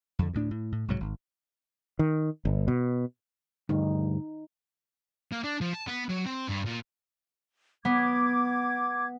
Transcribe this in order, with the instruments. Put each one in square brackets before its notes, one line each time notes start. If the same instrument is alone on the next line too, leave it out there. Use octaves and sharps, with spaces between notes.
[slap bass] F2 D3
D2 A2 D4
A2
A2
C2 G#2 F#3
G#1
[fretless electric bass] D#3
G1
B2
[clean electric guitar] D2 G2 [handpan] D#4
[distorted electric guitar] A#3
D4
F3
A5
B3
F#3
C4
G2
A#2
[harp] B3 [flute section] D6 G#6